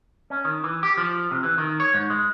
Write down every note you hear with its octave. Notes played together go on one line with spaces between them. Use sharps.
C#4
D#3
E3
G4
F3
C3
E3
D#3
C#5
G#2
G#3